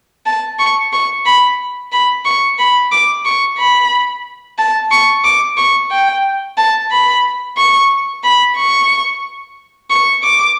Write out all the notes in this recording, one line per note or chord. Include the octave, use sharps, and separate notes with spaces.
A5
C#6
C#6
B5
B5
C#6
B5
D6
C#6
B5
A5
C#6
D6
C#6
G5
A5
B5
C#6
B5
C#6
C#6
D6